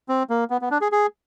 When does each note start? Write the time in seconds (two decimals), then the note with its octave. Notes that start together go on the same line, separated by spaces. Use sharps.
0.09 C4
0.30 A#3
0.50 B3
0.62 B3
0.71 D4
0.81 G#4
0.92 G#4